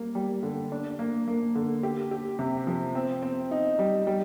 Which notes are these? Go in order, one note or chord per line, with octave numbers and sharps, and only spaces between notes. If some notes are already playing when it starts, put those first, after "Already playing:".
Already playing: G3 A#3
G3
D3
D4
A#3
A#3
D3
G4
G4
C3
F3
C4
C4
D#4
G3
G3